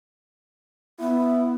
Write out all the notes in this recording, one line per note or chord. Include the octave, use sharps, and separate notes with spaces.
B3 E4